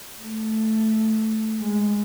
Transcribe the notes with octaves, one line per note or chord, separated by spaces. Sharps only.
A3
G#3